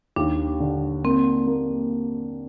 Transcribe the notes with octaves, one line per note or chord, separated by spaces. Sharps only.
D#2 D4
D3
A#3 C4
A#3